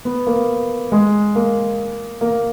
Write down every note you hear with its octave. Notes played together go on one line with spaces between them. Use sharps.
B3
A#3
G#3
A#3
A#3